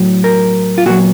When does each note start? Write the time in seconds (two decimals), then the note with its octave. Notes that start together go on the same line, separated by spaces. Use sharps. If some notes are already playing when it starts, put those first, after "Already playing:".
Already playing: A2 F#3
0.24 A#4
0.78 F4
0.86 A#2 F#3 F#4